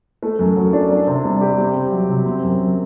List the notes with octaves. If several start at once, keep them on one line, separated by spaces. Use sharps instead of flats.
A3
F#2
F#3
D4
D4
C3
G3
G4
C4
C3
F#3
C3
C4
F#2
F#3